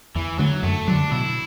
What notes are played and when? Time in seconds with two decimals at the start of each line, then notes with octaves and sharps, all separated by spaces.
0.15 E2 E3
0.39 D3 F#3 A3
0.63 F#2 A3
0.87 D3 F#3 D4
1.11 B2 E4